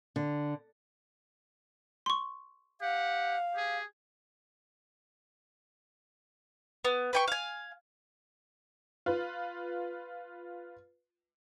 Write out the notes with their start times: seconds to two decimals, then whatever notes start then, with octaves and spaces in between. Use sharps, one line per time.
0.16 D3
2.06 C6 C#6
2.81 G4 F5 F#5
3.55 G4 G#4
6.85 B3
7.13 B4 G5 C#6
7.28 F5 G#5
9.06 F4 B4